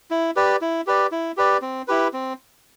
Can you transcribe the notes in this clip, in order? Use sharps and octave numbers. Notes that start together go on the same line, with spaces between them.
E4
G4 B4 D5
E4
G4 B4 D5
E4
G4 B4 D5
C4
E4 G4 B4
C4